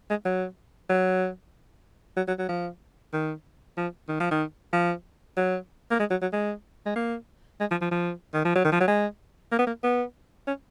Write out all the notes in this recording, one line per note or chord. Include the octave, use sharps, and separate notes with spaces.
G#3
F#3
F#3
F#3
F#3
F#3
F3
D#3
F3
D#3
F3
D#3
F3
F#3
A#3
G#3
F#3
F#3
G#3
G#3
A#3
G#3
F3
F3
F3
D#3
F3
F#3
D#3
F3
F#3
G#3
A#3
B3
A#3
B3
C#4